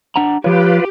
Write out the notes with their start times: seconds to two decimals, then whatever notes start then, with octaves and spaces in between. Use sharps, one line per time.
0.16 D4 F#5 A#5
0.44 F3 F4 G4 B4 C#5